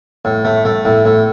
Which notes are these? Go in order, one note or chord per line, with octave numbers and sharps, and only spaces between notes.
A2
A3
A3
A2
A2